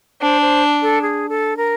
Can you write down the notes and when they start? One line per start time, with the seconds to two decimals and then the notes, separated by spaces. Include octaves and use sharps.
0.21 D4 C5
0.42 C5
0.82 A4
1.02 G#4
1.29 A4
1.57 A#4